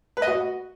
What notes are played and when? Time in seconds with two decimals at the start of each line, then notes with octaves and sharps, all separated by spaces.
0.17 B4
0.22 D#5
0.27 F#4